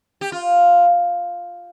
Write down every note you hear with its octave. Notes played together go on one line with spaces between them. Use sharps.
G4
F4